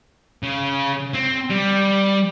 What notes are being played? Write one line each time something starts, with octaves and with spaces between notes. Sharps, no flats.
C#3
C4
G3